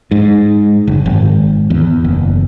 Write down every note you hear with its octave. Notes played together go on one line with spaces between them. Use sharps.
G#2
F#1
G#1
E2
F#1